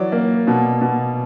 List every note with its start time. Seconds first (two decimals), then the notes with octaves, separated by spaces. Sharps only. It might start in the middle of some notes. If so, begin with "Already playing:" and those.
Already playing: E3 F#3 D5
0.12 A#3
0.47 B2
0.81 B2